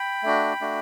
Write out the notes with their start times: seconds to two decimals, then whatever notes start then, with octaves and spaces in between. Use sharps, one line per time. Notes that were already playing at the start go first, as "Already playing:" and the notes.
Already playing: G5 B5
0.23 A3 D4 F#4
0.61 A3 D4 F#4